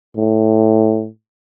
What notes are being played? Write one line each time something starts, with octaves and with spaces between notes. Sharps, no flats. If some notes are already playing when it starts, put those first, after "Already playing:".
A2